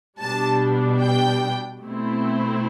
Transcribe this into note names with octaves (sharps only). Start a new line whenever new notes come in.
B2 G3 D4 A5
G5
B2 A3 C4 E4